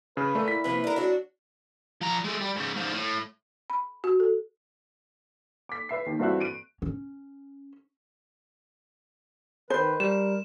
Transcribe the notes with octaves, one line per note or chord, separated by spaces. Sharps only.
C#3 B4
A#2 A3
E4 B6
C3 F3 A#3 B4
D4 A#4
F#3 D4 F#4
F3 A#5
G#3 A3
G3
G#2 C#3
G#2 F3
A2
B5
F#4
A4
D6 B6
B4 E5 C7
D#2 D#3
G2 E3 C4 F#4 E5 F#6
D7 D#7
C#4
D#3 B4 C5
G3 A#4 E7